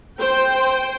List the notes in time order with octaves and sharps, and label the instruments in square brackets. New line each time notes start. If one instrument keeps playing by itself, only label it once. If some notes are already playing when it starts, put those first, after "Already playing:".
[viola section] C5 G5